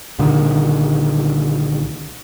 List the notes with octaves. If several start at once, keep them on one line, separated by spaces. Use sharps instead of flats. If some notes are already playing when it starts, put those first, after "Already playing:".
C2 A#2 D3 D#3